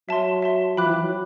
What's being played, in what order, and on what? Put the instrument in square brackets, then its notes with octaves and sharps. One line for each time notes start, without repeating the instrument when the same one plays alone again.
[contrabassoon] F#3 [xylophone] E5 A5 C6
[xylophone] E5 A5 C6
[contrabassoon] F3 [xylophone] E5 G5 B5 D6 F#6
[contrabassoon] E3
F#3